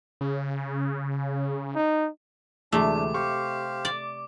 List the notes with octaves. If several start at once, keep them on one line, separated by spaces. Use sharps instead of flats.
C#3
D#4
D2 C3 E3 G#3 A3 D4 D6
G4 C5 F5 C#6
D5